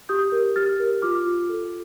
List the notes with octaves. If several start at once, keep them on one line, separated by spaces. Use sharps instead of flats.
G4 D#6 G6
A#4
G4 F6 A6
A#4
F4 D6 F6
F4
A4